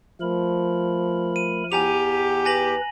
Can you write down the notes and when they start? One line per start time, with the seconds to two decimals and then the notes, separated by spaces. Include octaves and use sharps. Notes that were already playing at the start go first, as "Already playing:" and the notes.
0.21 F3 A3 A#4 B5
1.36 D#7
1.72 E2 G4 F#5 G#5 A#5 F7
2.45 B4 G#5 A#6 F#7